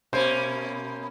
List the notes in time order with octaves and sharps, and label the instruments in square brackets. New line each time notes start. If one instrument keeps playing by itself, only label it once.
[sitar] B2 A#3 C#4 [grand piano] C5